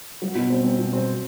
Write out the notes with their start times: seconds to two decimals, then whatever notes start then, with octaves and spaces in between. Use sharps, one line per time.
0.22 F#3
0.35 B2
0.50 C4
0.64 C4
0.78 B2
0.93 C4